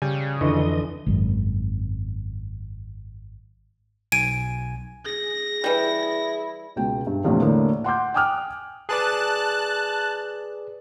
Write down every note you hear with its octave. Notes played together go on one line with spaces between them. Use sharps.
C#3 G3 G#5
F2 D3 E3 D#5
G#1 F#2
B1 G#5 G#6 D7 D#7
G#4 A#6
E3 G3 E4
C#2 B2 G5
G2
A#1 E2 A2 C3 F3 G3
A2 D3 A#3
F#5 C6 D6 G6
G5 G#5 D6 D#6 F6 F#6
G#4 B4 D5 A5 F#6